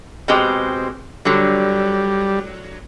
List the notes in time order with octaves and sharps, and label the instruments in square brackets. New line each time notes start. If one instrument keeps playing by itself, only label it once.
[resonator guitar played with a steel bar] B2 G#3 G4 [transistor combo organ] C4
[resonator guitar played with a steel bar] D3 F#3 [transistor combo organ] G3